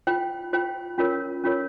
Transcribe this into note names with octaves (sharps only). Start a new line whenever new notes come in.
F4 C5 G5
F4 C5 G5
C#4 F4 A#4 C#5
C#4 F4 A#4 C#5